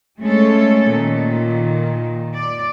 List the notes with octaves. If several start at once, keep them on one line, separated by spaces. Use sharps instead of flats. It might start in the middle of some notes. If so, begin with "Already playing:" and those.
G#3 A3 C#4 A4 C#5
A#2 D#3
D5